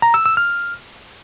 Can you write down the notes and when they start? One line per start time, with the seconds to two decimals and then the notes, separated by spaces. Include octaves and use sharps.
0.02 A#5
0.14 E6
0.26 E6
0.37 F6